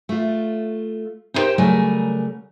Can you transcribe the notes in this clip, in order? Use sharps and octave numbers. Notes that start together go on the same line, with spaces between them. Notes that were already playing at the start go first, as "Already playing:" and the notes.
A3 F4
D#4 E4 G4 A#4 C5 G5
C#3 F#3 G3 A3 A#4 G#5